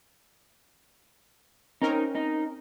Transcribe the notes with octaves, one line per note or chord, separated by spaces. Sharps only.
C4 C#4 D#4 A#4
D#4